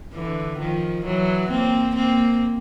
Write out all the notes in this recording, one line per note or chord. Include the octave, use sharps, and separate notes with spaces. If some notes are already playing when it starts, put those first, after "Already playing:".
D3 E3
D#3 F3
E3 F#3
A#3 C4
A#3 C4